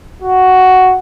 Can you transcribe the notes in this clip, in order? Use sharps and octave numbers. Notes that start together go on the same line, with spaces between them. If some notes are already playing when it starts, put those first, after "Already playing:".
F#4